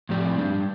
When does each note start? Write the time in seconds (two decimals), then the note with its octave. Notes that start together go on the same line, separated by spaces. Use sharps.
0.09 A2 F3 C4 G4 D5
0.38 G3 D4 G4